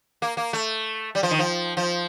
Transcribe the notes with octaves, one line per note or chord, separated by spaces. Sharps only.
A#3
A#3
A3
G3
F3
D#3
F3
F3